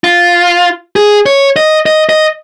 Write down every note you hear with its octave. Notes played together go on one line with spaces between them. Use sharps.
F4
G#4
C#5
D#5
D#5
D#5